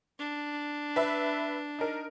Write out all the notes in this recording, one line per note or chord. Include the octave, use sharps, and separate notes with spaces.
D4
B4 E5
D#4 A#4